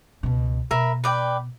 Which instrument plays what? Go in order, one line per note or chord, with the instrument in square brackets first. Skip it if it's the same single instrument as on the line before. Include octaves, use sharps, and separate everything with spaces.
[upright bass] C#2 B2
[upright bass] B2 [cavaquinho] A#4 E5 B5
[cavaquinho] B4 D5 G5